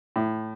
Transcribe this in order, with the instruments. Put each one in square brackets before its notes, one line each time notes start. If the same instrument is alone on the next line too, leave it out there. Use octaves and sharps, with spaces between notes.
[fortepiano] A2